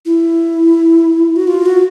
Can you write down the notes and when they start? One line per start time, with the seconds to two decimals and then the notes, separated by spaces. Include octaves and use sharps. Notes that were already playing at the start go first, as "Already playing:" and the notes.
0.06 E4
1.36 F#4
1.47 F4
1.66 F#4